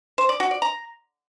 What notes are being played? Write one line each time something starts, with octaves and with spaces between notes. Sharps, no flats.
C5
D5
F#4
D5
A#5